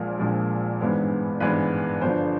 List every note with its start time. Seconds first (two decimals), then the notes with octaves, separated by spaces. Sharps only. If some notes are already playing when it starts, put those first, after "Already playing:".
Already playing: A#1 A#2 F3 G#3 A#4
0.19 A#1 A#2 F3 G#3
0.80 G#1 G2 E3 G#3 B3
1.40 G#1 G2 E3 G#3 B3 B4
2.01 G1 G2 D3 F3 C5